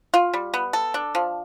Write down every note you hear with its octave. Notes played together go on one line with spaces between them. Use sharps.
F4
G3
B3
A4
D4
F3